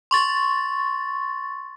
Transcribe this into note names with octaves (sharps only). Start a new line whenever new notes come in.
C6 C#6 A6